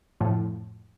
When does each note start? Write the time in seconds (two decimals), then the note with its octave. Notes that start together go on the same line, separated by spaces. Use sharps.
0.20 F2 A2